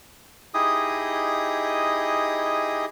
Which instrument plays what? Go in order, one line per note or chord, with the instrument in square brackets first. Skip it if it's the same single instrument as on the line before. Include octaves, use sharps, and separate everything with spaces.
[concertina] D#4 E4 G4 G#4 D#5 D#6